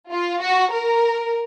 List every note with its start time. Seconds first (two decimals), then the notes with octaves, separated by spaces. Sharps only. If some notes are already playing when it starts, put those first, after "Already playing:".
0.11 F4
0.41 F#4
0.72 A#4